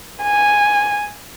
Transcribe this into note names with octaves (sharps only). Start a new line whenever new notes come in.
G#5